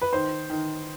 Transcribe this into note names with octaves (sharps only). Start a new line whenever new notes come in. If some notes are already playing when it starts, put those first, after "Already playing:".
B4
D#3 C5
D#3